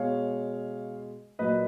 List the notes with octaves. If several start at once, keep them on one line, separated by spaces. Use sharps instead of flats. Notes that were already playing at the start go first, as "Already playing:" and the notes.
Already playing: B2 G#3 C#5 F5
A#2 F#3 A#3 B4 D#5